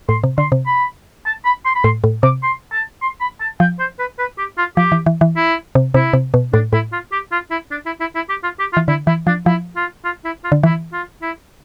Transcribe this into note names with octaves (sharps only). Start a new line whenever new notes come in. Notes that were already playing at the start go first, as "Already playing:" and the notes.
A2 C6
C3
D3 C6
C3
B5
A5
B5
C6
B5
A2 C6
A2
C3 D6
C6
A5
C6
B5
A5
F3 G5
C5
B4
B4
G4
F4
F3 G4
E3
E3
E3
E4
C3
C3 E4
C3
B2
A2 D4
A2 E4
F4
G4
F4
E4
D4
E4
E4
E4
G4
F4
G4
F4
E3
D3 E4
E3 E4
F3 D4
F3 E4
F4
F4
E4
F4
D3
E3 E4
F4
E4